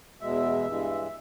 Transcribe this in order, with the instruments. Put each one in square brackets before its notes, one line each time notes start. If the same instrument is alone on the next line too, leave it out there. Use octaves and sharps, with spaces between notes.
[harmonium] E2 B2 G#3 E5
G2 E3 G#3